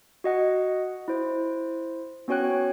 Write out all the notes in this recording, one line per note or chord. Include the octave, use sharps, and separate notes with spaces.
F#4 D#5 F#5
E4 C5
B3 C#4 F#4 C#5 G5 F#6